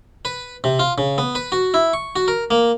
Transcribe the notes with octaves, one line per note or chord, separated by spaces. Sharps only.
B4
C3
F4
C#3
B3
B4
F#4
E4
C#6
F#4
A#4
A#3